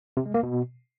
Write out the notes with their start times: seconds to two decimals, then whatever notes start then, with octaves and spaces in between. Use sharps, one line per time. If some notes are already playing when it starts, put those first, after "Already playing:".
0.17 C3
0.26 G#3
0.34 A#3
0.43 B2